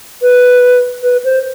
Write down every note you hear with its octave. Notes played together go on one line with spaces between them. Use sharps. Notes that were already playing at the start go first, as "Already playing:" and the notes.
B4
B4
C5